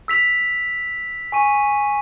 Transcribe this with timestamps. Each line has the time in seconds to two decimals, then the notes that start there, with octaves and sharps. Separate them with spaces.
0.08 E6 B6 F7
1.32 G#5 C#6 D#7